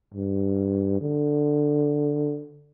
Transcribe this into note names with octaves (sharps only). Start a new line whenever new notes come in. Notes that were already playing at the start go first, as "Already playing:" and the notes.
G2
D3